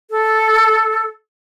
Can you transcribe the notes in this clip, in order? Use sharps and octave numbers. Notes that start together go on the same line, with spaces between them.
A4